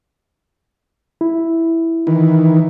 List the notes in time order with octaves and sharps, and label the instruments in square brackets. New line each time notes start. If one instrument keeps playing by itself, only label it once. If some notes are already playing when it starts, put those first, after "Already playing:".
[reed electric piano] E4
[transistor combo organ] D#3 E3